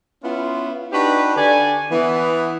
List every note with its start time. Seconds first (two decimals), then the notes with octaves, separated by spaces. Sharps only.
0.24 B3 C#4 E4 F4
0.93 D4 D#4 F#4 G4 B4
1.37 D3 D5 G#5
1.92 E3 B3